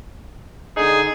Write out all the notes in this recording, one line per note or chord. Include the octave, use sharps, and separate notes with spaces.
D3 D#4 G#4